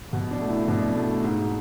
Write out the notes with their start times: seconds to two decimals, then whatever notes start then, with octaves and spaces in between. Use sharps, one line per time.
0.13 B2
0.31 D4
0.41 A3
0.49 E4
0.68 B2 D4
0.96 A3
1.24 G#2